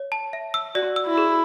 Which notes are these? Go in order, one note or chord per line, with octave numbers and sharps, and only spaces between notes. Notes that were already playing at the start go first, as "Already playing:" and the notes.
Already playing: C#5
A5
E5
E6
F#4 D5
E6
E4
G#4